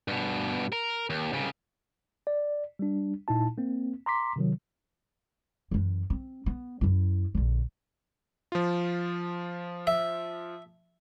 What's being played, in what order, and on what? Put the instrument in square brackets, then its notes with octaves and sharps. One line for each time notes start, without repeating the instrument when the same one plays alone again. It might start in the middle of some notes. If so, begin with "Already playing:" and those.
[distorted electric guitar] G2 B2
A#4
D#2
C2 C#3
[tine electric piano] D5
G3 D4
A#2 D#4 E4 A5
A#3 C4
A#5 C6 D6 B6
C3 D#3 F#3
[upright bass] F#2 E3
C4
B3
F#2 E4
A#1 D3
[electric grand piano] F3 F4
[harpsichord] E5